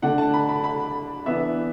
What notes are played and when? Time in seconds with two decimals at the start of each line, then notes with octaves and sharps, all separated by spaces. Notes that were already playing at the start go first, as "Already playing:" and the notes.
0.02 D3 A3 D4 F#5
0.18 A5
0.34 B5
0.49 B5
0.64 B5
1.26 E3 B3 D4 E5